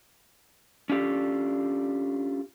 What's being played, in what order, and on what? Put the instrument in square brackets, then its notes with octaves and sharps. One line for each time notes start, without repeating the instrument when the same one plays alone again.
[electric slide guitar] C#4 D4 F4 G4 A4